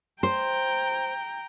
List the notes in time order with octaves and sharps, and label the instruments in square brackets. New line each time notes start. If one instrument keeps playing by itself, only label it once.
[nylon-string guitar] C5 [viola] G5 A#5